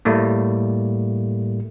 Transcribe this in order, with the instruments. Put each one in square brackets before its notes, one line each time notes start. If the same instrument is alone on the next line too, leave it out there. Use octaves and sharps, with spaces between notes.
[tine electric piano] A2 G3 A3 A#3